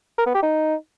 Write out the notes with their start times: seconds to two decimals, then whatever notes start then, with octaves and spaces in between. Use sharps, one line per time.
0.18 A#4
0.26 B3
0.35 G4
0.43 D#4